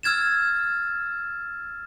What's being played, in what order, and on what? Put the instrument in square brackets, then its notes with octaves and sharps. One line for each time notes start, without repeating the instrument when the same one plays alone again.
[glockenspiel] E6 F6 G#6 A6 E7